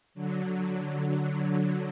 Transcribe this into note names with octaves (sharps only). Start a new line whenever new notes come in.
D3 F#3